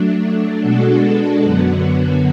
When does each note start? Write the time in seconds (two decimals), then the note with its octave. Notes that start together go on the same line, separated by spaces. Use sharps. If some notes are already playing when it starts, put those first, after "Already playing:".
Already playing: F#3 A3 D4
0.62 B2 G#3 D4 F#4 A4
1.43 F#2 D3 F#3 B3 F#4